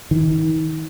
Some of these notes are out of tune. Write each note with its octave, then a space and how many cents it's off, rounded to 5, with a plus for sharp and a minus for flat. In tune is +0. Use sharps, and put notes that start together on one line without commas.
D#3 +40